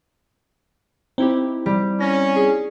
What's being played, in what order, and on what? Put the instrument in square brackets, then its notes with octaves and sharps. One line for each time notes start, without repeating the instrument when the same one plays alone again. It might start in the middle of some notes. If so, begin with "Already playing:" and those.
[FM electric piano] C4 [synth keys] D#4 E4 G4
[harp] G3
[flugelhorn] C#4 [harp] A#6
[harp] G#4